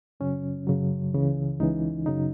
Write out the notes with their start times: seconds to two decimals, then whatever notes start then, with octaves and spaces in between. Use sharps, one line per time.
0.20 F#2 C#3 F#3 C#4
0.67 F#2 C#3 F#3
1.14 C#2 C#3 E3
1.59 C#2 C#3 E3 D#4
2.06 F#2 C#3 F#3 D#4